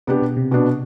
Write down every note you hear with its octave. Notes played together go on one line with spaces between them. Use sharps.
C3 B3 D4 G4
B2
C3
B2 B3 D4